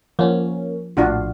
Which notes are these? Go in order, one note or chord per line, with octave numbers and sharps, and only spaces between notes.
F3 A#3 C#4
A#1 A2 D4 F4 F#4